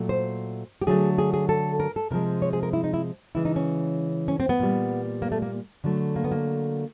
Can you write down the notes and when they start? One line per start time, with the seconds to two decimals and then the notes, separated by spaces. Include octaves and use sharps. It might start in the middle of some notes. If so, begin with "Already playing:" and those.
Already playing: A#2 F#3 A3
0.09 C5
0.82 G4
0.87 D3 F#3 A3 G#4
1.18 G#4
1.34 G#4
1.49 A4
1.80 A#4
1.96 A4
2.10 C3 F3 G#3 A#4
2.42 C#5
2.53 G#4
2.63 A#4
2.73 E4
2.84 D#4
2.94 E4
3.35 C#3 E3 G#3 E4
3.45 D#4
3.56 C#4
4.28 C#4
4.40 C4
4.49 B3
4.60 A#2 G3
5.22 A#3
5.32 A3
5.42 A#3
5.84 D3 F#3 A3
6.16 A#3
6.24 B3
6.31 A#3